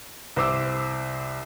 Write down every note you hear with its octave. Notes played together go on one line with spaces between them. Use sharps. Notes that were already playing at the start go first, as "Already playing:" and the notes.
C2 C5 D6 E6